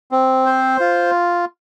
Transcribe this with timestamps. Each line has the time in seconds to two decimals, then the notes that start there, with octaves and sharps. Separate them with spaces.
0.12 C4
0.46 C5
0.80 F4